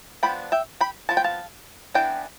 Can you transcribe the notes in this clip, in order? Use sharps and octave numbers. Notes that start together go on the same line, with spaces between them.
F3 B3 D4 G5 B5
E5 G5
G5 B5
F3 B3 A5
G5
F5 A5
E3 B3 D4 G5